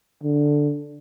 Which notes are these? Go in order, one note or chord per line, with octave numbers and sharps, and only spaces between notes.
D3